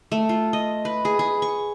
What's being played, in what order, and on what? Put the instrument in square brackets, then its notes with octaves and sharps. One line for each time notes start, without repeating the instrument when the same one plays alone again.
[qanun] A3
F4
D#5
B4
G#4
G#4
C#6